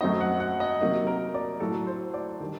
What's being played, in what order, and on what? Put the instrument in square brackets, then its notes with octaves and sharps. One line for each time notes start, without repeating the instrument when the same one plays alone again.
[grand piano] F#2 F#3 A3 C4 D#4 D#5
F#5
F#5
D#5
C3 F#3 A#3 D#4
A#4
D5
A2 F#3 A3 A4
C5
D5
D#3 G3 D4